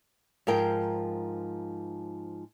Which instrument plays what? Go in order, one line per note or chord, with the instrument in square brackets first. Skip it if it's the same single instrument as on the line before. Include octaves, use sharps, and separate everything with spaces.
[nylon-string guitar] G#2 F3 A#4 G5